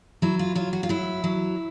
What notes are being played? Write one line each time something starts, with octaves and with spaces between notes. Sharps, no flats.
F#3 E4
F4
F#3 F4
F#4
F4
F#3 E4
F#3